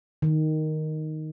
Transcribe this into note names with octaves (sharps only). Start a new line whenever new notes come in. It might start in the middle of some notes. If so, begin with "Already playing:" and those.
D#3